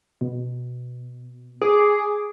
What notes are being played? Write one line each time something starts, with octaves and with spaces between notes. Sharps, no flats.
B2
G#4 D6